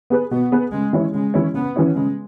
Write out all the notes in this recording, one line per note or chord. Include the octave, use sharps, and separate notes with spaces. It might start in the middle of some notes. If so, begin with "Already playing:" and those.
B3 G#4 B4
B2 B3
B3 G#4 B4
C#3 G#3
E3 C#4 E4 C#5
C#3 G#3
E3 C#4 E4 C#5
C#3 B3
E3 C#4 E4 C#5
C#3 G#3